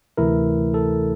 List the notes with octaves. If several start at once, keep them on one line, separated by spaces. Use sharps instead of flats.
D2 C3 E3 A3 E4 A#4
A4